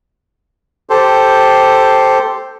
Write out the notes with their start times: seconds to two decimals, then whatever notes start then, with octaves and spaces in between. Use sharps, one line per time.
0.90 G4 A4 C5